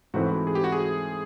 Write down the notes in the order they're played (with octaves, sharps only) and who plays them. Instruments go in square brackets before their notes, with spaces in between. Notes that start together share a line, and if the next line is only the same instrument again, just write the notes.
[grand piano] G#2 E3 A3 C4 E4 [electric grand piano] F#4
[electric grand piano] G#4
G4
F#4
G#4